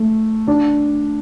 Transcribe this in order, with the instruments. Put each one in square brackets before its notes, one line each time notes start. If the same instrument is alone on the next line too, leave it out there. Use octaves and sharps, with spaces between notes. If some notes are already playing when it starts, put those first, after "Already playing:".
Already playing: [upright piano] A3
D4